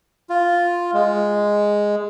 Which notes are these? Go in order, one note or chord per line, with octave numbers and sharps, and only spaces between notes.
F4
G#3